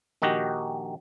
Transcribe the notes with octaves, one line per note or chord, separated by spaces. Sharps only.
A#1 D#3 D#4 F#4 G4 A#5